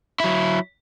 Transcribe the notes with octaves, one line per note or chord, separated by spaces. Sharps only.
F#3 E4